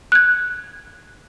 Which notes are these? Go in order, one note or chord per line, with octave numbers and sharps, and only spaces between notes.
F#6 G#6